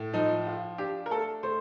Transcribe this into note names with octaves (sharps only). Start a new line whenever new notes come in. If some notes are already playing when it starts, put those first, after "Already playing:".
Already playing: A2
F3 D#4
F4
D4 G4
A#4
A3 A4
A3 C5